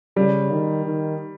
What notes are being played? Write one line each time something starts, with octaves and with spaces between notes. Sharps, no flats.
C#3 G3
D#3
D#3